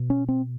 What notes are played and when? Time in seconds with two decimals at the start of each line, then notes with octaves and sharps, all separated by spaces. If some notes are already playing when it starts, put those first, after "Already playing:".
Already playing: B2
0.10 C#4
0.28 C4